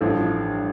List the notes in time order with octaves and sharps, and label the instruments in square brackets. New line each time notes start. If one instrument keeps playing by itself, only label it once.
[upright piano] A1 G2 F3 A4